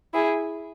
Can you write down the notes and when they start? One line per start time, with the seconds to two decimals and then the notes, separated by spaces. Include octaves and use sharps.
0.14 E4 G#4